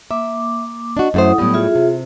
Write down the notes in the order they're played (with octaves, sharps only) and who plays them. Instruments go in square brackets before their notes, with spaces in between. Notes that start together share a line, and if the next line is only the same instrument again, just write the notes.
[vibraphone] A#3 D6 [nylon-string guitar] E5
[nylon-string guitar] D4 F#4 [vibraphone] D#5
[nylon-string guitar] F#2 A3 C5 [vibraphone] E4 F#5 D#6
[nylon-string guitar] A2 G3 [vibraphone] F#3 B3 D#6
[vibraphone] F4 G#4 E5
[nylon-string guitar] C3